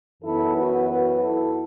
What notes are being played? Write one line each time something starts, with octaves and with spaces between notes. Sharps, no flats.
F#2 E3 B3 E4 A4
F#4 B4
F#4 B4
E4 A4